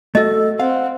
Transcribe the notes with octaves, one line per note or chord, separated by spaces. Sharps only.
A3 F#4 A4 D#5
C4 F5 F#5